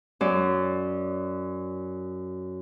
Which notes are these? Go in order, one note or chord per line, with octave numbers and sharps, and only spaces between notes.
F#2 D5